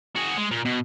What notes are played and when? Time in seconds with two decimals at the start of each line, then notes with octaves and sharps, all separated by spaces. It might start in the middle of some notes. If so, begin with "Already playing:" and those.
0.15 F#4 G#4
0.37 G#3
0.51 A#2
0.65 B2